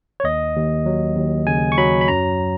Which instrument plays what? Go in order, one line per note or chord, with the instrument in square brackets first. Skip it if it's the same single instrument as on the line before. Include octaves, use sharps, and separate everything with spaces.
[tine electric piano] C#5
D#2 D#5
D#2
F#3
D#2
C#3 G#5
C#6
F#3 B5
B5
F#2 A#5